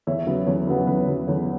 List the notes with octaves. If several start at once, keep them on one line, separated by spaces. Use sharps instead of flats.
E2 C#5 E5
C#3 F#3 B3
E2 C#5
C#3 F#3 B3 B4
C#5
E2 B4
C#3 F#3 B3
E2 C#5